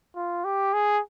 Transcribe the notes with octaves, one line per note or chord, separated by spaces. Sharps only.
F4
G4
G#4